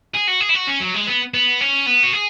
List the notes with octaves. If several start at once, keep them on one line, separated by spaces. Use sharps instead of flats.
G#4
F#4
G#4
E4
F#4
C#4
F#3
G#3
B3
B3
C#4
B3
F#4
G#4